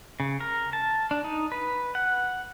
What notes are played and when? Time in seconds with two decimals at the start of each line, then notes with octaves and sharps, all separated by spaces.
0.20 C#3
0.40 A#4
0.73 A5
1.11 D4
1.24 D#4
1.52 B4
1.95 F#5